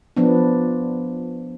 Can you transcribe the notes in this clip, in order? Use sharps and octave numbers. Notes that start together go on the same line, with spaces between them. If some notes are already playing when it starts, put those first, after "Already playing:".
F3 B3 D4